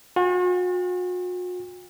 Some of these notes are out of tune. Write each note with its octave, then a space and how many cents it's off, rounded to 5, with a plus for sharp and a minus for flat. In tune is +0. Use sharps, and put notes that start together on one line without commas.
F#4 -45 G5 +40